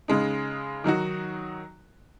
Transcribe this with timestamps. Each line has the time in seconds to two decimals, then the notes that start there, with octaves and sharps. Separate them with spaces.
0.08 C#3 G#3 D#4
0.84 D#3 F#3 D#4 F#4